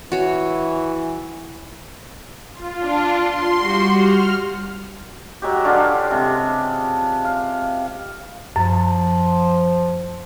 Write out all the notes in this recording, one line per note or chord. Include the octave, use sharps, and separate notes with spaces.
E3 F#4 C#5
F4
D4
C6
G3 F#4
F6
F#3 G#3 G4
D3 C#4 D4 F4
C3 G#3
F5
F#2 F3